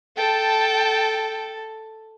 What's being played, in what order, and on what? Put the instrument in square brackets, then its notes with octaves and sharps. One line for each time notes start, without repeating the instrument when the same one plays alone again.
[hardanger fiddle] A4 [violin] G5 A5